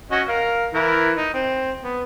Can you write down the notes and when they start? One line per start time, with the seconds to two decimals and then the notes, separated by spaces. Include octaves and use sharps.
0.11 C#4 F#4 D#5
0.28 A#4 F5
0.74 E3 E4 A#4
1.17 D#4
1.34 C4
1.84 B3